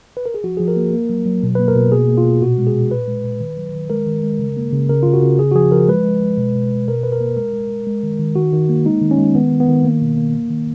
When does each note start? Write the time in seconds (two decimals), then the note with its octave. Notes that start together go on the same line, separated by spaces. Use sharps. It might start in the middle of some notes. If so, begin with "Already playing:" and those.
0.17 B4
0.26 A#4
0.34 G#4
0.44 F3 F#4
0.57 F3 G#4
0.68 A#4
0.77 A#3
0.93 A#3
1.10 F#3
1.26 F#3
1.43 B2
1.55 A#3 B4
1.68 A#4
1.76 B2
1.92 B2 G#4
2.08 A#3
2.17 F4
2.25 B2
2.42 A#2 F#4
2.58 G#3
2.67 G#4
2.74 A#2
2.91 A#2 B4
3.08 G#3
3.25 A#2
3.40 D#3
3.57 F#3
3.74 D#3
3.90 G#3 A#4
4.07 D#3
4.23 G#3
4.39 C#3
4.57 A#3
4.73 C#3
4.89 C#3 A#4
5.03 C#3 F4
5.14 F#4
5.23 C#3
5.39 C#3 G#4
5.51 F#4
5.55 F3 G#4
5.72 F3 A#4
5.88 G#3 B4
6.04 G#3
6.22 G#3
6.38 B2
6.55 B2
6.71 B2
6.88 B2 A#4
7.03 B2 B4
7.12 A#4
7.20 A#3
7.37 G#3 A#4
7.54 G#3
7.70 G#3
7.87 G#3
8.03 D#3
8.19 D#3
8.36 D#3 F#4
8.53 D#3
8.69 A#3
8.86 G#3 D#4
9.02 D#3
9.11 C#4
9.18 G#3
9.35 D#3 B3
9.52 D#3
9.60 B3
9.68 D#3
9.85 A#3
10.02 B2
10.17 A#3
10.34 A#3
10.50 D#3